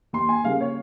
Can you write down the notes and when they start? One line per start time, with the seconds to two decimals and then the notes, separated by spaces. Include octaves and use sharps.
0.13 D#2 C6
0.29 G#5
0.44 C#3 G3 A#3 F5
0.60 C#5